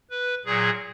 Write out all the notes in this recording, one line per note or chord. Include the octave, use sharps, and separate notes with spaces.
B4
A#2 F#3 G#4